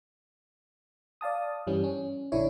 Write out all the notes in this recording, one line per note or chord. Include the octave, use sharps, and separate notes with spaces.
D5 F5 A5 D#6
G2 E3 G3 C#4
C#4
A#1 D3 D4 E4 C#5